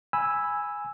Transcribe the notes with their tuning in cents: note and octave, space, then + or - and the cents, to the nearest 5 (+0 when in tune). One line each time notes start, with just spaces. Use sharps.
G#5 -5 B5 +0 E6 +0